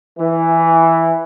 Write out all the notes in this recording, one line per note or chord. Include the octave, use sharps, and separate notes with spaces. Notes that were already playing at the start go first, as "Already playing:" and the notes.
E3